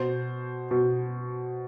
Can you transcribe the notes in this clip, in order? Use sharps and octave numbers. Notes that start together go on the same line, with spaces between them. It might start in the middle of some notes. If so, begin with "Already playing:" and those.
Already playing: B2 C5
B2